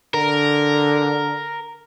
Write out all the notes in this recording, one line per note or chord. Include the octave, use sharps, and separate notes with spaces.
D3 A#4